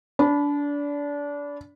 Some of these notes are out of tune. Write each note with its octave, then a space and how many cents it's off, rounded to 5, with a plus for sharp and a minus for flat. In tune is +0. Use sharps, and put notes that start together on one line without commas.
D4 -25 B5 +0